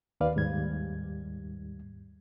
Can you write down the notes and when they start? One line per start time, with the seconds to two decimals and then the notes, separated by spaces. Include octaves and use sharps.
0.21 D#2 A#3 B4 D5 F5
0.36 D#2 G#2 G3 G#6